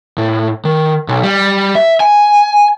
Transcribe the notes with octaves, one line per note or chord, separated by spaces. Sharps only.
A2
D#3
B1
G3
E5
G#5